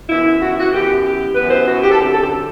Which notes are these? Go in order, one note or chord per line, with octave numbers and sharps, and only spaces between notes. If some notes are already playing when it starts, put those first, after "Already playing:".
F#2 E3 B3 E4
F#4
E4
F#4
F#2 E3 B3 G4
G4
F#2 E3 B3 B4
C5
F#4
G4
A4
F#2 D3 F#3 C4 G4
A4
G4
A4